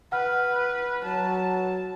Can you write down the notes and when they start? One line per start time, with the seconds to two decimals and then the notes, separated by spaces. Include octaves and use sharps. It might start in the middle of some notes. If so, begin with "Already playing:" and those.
0.12 B4 F#5 F6
1.04 F#3 A5